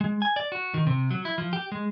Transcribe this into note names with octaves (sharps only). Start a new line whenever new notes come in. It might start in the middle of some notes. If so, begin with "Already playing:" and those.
G#3
G#5
D5
F#4
D#3
C3
F#3
E4
F3
G4
G#3